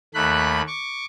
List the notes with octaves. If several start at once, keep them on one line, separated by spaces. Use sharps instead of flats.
D#2 A3 B5 F#6
C#6 D6